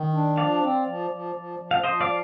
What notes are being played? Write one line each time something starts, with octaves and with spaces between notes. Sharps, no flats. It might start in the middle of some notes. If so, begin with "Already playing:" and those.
Already playing: D#3
D4
F3 D5 F5
C4
F3
F3
F3
F3
F5
F3 C5 D#5
D5 F5